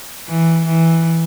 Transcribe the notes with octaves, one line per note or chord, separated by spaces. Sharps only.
E3
E3